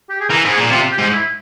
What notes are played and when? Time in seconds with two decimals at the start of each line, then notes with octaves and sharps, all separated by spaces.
0.09 G4
0.20 G#4
0.30 E3 A#4
0.45 G#2
0.50 G#4
0.57 A#2
0.71 C3 F4
0.91 G4
0.99 G#2
1.13 E4